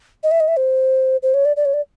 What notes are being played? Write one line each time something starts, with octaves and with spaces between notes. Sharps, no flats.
D#5
E5
D#5
E5
C5
C5
C#5
D5
D5
C#5
D5